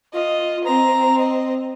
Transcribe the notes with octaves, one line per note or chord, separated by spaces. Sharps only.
F4 D#5
C4 A#5
D#5